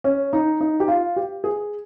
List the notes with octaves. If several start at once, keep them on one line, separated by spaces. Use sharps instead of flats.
C#4
D#4
D#4
G4
F4
G4
G#4